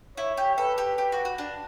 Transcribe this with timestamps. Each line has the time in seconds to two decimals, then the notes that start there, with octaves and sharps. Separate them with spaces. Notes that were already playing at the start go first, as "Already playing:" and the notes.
0.17 E4 C#5
0.37 G4
0.58 A4 B4
0.78 G4
0.98 G4
1.12 F#4
1.25 F#4
1.38 D4